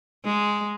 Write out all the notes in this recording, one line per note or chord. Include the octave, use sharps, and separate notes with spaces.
G#3